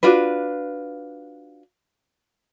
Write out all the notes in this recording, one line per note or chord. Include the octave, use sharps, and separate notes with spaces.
D4 F4 F#4 B4